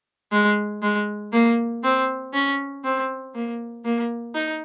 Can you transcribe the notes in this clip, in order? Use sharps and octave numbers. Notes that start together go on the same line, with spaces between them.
G#3
G#3
A#3
C4
C#4
C4
A#3
A#3
D#4